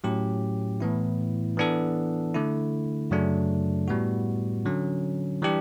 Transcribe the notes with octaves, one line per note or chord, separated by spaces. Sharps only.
A2 F#3 C#4 G4
A2 E3 B3 E4
E3 B3 D4 A4
D3 A3 E4
F#2 C#3 F#3 A3 D4
A2 G3 B3 F#4
D3 F#3 C#4
E3 G3 D4 G4